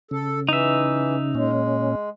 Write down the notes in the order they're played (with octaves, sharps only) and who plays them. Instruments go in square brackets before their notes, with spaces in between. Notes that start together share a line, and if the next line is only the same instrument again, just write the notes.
[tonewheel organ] C#3 [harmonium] A4
[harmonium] E3 [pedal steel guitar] D#4 E5
[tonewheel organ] A#2 C#4 [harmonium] G#3